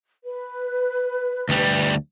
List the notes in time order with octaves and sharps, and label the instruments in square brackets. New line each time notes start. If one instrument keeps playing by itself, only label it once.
[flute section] B4
[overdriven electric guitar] D2 G3